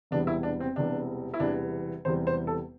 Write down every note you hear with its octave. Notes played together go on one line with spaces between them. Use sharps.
E1 E2 C3 E3 G3 D4
E4
D4
C4
E1 E2 C3 E3 G3 D4
E4
E1 E2 C3 E3 G3 D4
E1 E2 C3 E3 G3 C5
C5
A4